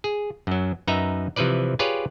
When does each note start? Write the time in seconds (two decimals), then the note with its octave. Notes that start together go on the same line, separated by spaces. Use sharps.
0.04 G#4
0.47 F#2 F#3
0.88 F#2 D#4 B4 E5 A#5
1.36 C3 E3 F3 B4 D5
1.79 F4 G4 G#4 B4 C#5 D5